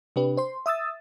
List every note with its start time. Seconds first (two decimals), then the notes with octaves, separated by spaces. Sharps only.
0.16 C3 D4 G4 B4
0.37 C5 C6
0.66 E5 D#6 E6 A6